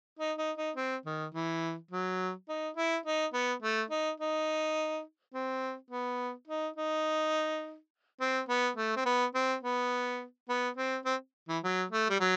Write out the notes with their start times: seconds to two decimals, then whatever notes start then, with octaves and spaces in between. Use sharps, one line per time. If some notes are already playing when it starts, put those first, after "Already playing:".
0.19 D#4
0.38 D#4
0.57 D#4
0.76 C4
1.06 D#3
1.34 E3
1.91 F#3
2.49 D#4
2.77 E4
3.06 D#4
3.33 B3
3.62 A3
3.90 D#4
4.20 D#4
5.34 C4
5.91 B3
6.48 D#4
6.76 D#4
8.20 C4
8.49 B3
8.77 A3
8.96 C4
9.06 B3
9.35 C4
9.63 B3
10.49 B3
10.77 C4
11.05 C4
11.48 E3
11.63 F#3
11.91 A3
12.09 G3
12.20 F#3